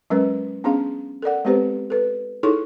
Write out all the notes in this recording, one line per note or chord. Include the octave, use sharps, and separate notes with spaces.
F#3 G#3 C#4 A#4 B4
B3 C#4 D4 G#4 F5
A4 A#4 D5 F#5
G#3 B3 C4 G4 B4 C5
A4 B4
D#4 E4 G#4 A4 C#5 C#6